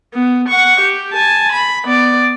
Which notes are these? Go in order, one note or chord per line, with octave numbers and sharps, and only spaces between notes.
B3
F#5 C#6
G4
G#5 A5
B5
B3 D5